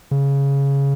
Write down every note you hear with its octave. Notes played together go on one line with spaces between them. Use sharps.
C#3